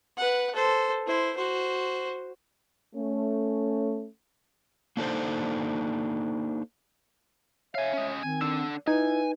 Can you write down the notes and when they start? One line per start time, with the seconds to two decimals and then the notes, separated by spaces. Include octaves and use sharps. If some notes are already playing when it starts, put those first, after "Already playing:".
0.17 B4 F#5
0.54 A4 C5
1.06 E4 C5
1.36 F#4 C5
2.94 A3 C#4
4.97 A#3 D4 D#4 A4 C5
7.75 C#5 E5 F5 G#5
7.93 C#4 D#5
8.23 D#3 C4 G#5
8.41 D3 D4 E6
8.88 D#4 E4 B4 G#5